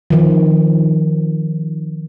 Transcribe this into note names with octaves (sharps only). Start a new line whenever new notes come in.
D#3 F3